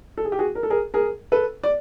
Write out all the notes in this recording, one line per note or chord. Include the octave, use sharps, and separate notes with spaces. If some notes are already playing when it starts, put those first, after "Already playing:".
A4
G#4
G4
F#4 G#4
A#4
A4
G#4 A#4
G#4 A#4
A4 B4
D5